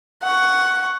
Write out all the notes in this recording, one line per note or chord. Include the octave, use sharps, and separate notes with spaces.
F#5 C#6